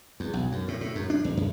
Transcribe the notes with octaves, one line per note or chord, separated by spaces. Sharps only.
E2
B1
F#2
A2
A2
F#2
D4
E2
F#2